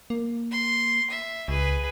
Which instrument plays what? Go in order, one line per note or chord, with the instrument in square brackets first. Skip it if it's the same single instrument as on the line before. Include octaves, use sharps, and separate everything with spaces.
[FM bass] A#3
[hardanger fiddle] C6
E5
[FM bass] C#2 [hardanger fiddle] G#4 B4